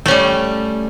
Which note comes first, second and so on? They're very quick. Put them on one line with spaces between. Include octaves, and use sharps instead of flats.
A3 C#4 G3